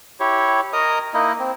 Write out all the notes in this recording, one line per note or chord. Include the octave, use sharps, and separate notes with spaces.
E4 G4 C#5
A#4 D#5 A#5 D#6
A#3 D#4 E4 D#5
C4